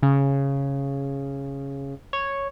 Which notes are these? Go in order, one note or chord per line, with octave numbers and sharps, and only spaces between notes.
C#3
C#5